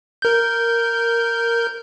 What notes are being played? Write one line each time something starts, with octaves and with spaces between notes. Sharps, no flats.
A#4 G6